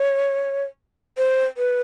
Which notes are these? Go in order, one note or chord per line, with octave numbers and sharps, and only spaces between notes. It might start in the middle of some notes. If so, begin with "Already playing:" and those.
Already playing: C#5
C5
B4